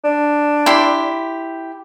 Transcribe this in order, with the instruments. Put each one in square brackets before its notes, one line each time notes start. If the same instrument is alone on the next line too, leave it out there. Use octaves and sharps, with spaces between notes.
[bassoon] D4
[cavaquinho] E4 G4 C6